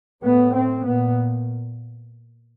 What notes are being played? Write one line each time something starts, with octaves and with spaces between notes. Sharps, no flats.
A2 B3
C4
A#2 B3